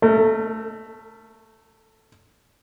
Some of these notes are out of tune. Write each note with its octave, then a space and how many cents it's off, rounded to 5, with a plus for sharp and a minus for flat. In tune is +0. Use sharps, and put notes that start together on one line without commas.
A3 +0 A#4 -35